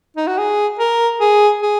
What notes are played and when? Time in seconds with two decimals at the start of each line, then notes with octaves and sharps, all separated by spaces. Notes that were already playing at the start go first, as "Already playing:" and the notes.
0.17 D#4
0.27 F#4
0.38 G#4
0.79 A#4
1.20 G#4
1.62 G#4